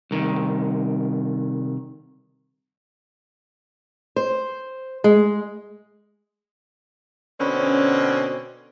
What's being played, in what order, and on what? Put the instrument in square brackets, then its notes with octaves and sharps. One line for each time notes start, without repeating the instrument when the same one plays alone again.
[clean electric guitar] C2 D#3
[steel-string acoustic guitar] C5
G#3
[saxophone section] B2 D3 C4 C#4